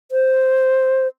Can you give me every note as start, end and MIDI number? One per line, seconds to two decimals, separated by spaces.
0.12 1.07 72